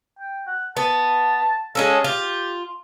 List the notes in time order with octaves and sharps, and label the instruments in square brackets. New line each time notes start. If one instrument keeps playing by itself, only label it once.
[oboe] G5
F#5
[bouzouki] B3 [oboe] A5
[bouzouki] G#3 C#4 A4 [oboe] F5
[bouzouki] F4 [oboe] G4